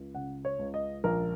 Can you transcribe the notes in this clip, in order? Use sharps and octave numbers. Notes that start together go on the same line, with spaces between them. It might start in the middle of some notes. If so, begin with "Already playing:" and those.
Already playing: C#2
C#3 F#5
C#5
C#2
D#5
A#1 A#4